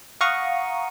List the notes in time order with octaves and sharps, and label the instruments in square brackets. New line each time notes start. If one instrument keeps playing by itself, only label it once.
[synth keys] F5 F#5 A#5 C#6 D#6